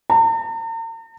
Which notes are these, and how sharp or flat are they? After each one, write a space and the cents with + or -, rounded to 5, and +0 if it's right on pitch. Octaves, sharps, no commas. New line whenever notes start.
A#5 -45